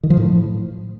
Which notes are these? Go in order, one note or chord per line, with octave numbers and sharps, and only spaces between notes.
D#3
F3
A2